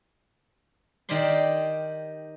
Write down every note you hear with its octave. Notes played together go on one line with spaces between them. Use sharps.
D#3 G4 C5 D5 C6